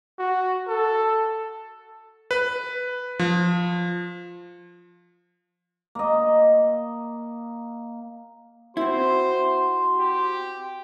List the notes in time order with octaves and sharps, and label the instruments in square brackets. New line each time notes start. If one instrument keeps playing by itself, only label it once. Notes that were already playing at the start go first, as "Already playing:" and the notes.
[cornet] F#4
A4
[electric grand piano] B4
F3
[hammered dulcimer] A#3 D#5
[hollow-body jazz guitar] C4 E4 [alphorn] F#4 [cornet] C5 [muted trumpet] C6
[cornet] G4